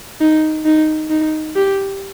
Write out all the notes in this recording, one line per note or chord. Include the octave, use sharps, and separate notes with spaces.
D#4
D#4
D#4
G4